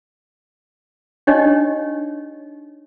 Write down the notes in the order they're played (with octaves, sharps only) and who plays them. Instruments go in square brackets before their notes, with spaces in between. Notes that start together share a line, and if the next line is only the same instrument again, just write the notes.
[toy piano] D4 D#4 G4 C#5 D#5